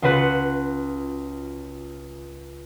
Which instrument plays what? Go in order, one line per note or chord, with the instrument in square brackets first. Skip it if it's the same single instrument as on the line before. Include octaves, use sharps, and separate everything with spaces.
[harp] C#2 F4 F#4 B4 F#6 C#7